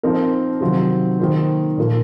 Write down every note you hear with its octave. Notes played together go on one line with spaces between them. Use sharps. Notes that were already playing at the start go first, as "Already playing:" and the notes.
F3 C4 D#4 A#4
C3 D#3 F#3 C4 F4
D#3 A#3 F4 C5
A#2 F3 A#3 F4 A#4